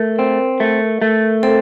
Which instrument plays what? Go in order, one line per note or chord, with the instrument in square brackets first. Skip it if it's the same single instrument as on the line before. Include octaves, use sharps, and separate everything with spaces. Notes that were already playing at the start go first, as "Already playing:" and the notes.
Already playing: [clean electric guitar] A3 [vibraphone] A#4
[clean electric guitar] C4
A3
A3
[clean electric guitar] C4 [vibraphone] A4